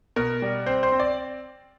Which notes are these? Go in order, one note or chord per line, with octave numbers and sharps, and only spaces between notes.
B2 A#4
G3
C4 C5
C5
C4
D5